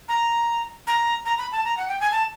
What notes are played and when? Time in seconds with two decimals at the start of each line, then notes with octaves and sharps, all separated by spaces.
0.09 A#5
0.87 A#5
1.26 A#5
1.38 B5
1.52 A5
1.65 A#5
1.77 F#5
1.88 G5
2.01 G#5
2.12 A5